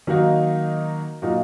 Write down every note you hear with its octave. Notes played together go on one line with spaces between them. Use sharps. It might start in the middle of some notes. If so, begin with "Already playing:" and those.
D#3 F#3 A#3 D#4 F#4
A#2 F#3 A#3 D#4 F#4